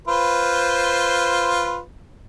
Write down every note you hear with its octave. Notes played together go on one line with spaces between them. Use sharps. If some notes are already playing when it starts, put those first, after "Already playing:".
F4 B4 C5